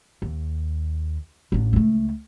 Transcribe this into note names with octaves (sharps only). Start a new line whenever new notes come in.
D#2
A1 D4
C#2 A3